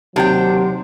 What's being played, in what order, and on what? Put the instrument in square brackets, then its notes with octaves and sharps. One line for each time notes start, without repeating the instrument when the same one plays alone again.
[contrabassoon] D#2 [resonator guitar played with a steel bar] C3 [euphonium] F#3 [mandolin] D4 C5 G5